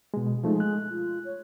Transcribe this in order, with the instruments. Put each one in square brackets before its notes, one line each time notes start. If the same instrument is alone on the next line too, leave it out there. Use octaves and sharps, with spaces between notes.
[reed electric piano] B2 G#3
[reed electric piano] F3 A3 D#4 [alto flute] G#3
[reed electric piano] F#6
[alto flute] F4
C#5